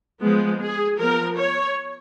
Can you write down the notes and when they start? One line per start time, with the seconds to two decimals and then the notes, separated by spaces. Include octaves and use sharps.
0.21 F3 G#3 B3
0.60 G#4
0.99 F3 B3 A#4
1.38 C#5